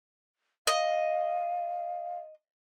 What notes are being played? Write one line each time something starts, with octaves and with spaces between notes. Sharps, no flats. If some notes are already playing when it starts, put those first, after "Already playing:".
D#5 F5